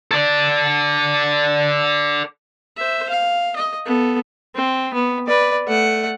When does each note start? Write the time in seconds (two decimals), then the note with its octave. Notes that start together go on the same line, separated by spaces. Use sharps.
0.11 A4 D5
2.77 C5 E5
3.10 F5
3.56 D#5
3.86 B3 A4
4.55 C4
4.94 B3
5.27 B4 D5
5.67 A3 F#5